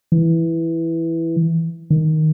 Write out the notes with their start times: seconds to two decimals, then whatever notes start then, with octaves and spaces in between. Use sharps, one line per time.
0.12 E3
1.90 D#3